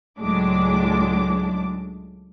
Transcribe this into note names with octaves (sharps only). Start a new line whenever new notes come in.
C#2 A2 F#3 G#3 D4 D6